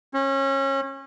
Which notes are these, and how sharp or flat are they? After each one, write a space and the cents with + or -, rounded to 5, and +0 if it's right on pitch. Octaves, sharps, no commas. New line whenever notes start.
C#4 -30